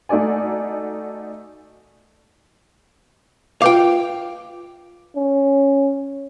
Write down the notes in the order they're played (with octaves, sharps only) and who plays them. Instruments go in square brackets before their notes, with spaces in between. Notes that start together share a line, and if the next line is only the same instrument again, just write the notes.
[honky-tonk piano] A3 D#4 F#4 D5 G#5
[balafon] F4 B4 D6 [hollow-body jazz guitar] F5 G5
[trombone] C#4